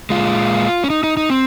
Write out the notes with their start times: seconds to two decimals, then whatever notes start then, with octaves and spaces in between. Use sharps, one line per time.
0.10 A#2 G#3 F4
0.84 C#4
0.90 D#4
1.03 D#4
1.17 D#4
1.30 C4